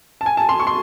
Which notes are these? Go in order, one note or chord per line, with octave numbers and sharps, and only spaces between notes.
A5
G#5
A5
C6
C#6
C6